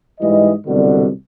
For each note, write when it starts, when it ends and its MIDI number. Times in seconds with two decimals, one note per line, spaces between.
0.20 0.53 44
0.20 0.53 52
0.20 0.53 55
0.20 0.53 75
0.67 1.08 36
0.67 1.08 42
0.67 1.08 47
0.67 1.08 50